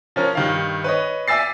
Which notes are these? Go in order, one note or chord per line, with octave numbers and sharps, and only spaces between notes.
F3 C#4 A#4
G2 D#3 F5
B4 C#5 D#5
D5 E5 G#5 E6 A6 C7